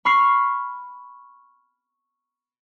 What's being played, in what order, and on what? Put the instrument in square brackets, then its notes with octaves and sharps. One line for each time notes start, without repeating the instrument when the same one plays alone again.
[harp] B5 C#6 F6 C7